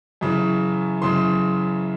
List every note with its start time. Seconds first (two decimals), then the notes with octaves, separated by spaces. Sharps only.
0.21 F#2 C#3 E3
1.01 F#2 C#3 E3 C6